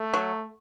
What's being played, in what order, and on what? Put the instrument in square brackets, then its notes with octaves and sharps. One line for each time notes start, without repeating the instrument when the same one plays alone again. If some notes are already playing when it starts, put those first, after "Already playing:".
Already playing: [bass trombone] A3
[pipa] F#3